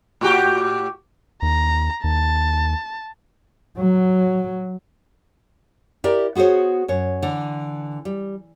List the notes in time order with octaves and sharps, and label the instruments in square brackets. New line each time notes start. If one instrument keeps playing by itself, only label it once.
[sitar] A2 F#4 G4
[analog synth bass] D#2 [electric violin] A#5
[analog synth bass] D#2 [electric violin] A5
[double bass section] F#3
[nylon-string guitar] E4 G4 A#4 D5
B3 F#4 G#4 C5 C#5
F#2 C#5
D3 E3
G3